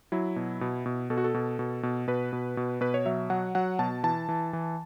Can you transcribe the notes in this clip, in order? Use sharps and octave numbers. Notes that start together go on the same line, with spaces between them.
F#3 E4
B2
B2
B2
B2 A4
F#4
A4
B2
B2
B2
B2 B4
B2
B2
B2 B4
C#5
F#3 E5
F#3 F#5
F#3 F#5
B2 A5
E3 A5
E3
E3